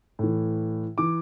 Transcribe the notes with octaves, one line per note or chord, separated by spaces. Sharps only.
A2 E3
E3 D6